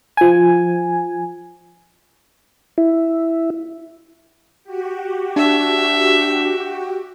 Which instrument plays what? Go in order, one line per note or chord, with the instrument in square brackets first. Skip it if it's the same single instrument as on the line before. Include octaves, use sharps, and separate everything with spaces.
[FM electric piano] F3 G#5
[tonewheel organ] E4
[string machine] F#4 G4
[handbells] D4 [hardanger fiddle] E5